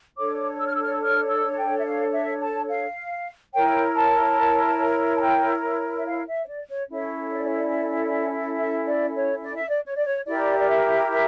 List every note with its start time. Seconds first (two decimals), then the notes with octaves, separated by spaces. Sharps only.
0.16 D4 A4 C#5 D6
0.58 E6
0.67 F6
0.75 E6
0.83 F6
0.91 E6
1.01 F6
1.29 E6
1.51 A5
1.57 G5
1.77 E5
1.85 F5
2.13 E5
2.41 A5
2.69 F5
3.53 E4 A#4 C#5 G5
3.95 A5
5.17 A5
5.22 G5
5.97 E5
6.06 F5
6.27 E5
6.43 C#5
6.47 D5
6.69 C#5
6.90 C#4 E4 A4 C#5
7.32 D5
7.44 C#5
7.56 D5
8.58 E5
8.86 D5
9.14 C#5
9.42 D5
9.55 E5
9.68 D5
9.84 C#5
9.95 D5
10.06 C#5
10.26 E4 G4 A#4 D5
10.59 D5
10.69 E5
11.11 E5